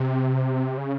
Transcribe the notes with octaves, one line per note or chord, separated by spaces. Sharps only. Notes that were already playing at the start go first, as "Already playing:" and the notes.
Already playing: C3
C#3